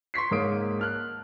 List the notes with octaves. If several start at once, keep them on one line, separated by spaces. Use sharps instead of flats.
C6 C#6 B6 C7
G#2 A#3 C#5 D#6 D7
A5 F6 F#6